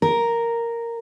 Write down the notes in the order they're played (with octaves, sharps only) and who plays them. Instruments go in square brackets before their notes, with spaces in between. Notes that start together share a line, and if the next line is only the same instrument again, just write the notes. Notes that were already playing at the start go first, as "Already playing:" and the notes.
[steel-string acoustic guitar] A#4